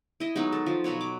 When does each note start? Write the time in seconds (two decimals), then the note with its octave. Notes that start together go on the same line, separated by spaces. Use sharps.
0.20 E4 D#5
0.36 F#3 G#3 B3 D#4
0.52 A4
0.66 F3
0.84 B2 F#3 B3 C#5
1.01 D6